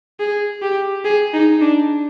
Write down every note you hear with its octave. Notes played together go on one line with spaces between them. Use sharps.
G#4
G4
G#4
D#4
D4